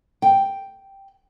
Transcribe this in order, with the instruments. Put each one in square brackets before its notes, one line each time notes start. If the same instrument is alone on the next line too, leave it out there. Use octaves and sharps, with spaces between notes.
[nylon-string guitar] G5